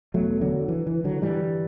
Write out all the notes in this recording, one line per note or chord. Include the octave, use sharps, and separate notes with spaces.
E2 B2 F#3 A3
D3 F#3
E3
E3
D3 F#3
G2 D3 E3 G3